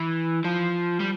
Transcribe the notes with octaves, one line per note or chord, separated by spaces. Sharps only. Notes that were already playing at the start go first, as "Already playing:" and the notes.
Already playing: E3
F3
G3